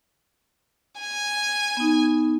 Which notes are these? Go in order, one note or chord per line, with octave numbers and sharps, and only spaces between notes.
G#5
B3 D#4